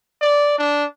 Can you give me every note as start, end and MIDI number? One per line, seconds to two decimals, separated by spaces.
0.21 0.57 74
0.58 0.85 62